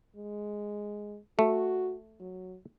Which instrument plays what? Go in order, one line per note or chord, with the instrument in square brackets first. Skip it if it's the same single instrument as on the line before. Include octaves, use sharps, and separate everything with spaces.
[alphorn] G#3
[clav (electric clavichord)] A3 [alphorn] F#4
[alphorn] F#3